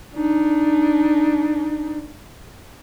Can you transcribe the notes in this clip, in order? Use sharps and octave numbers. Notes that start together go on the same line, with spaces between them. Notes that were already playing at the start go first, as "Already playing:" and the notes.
D4 D#4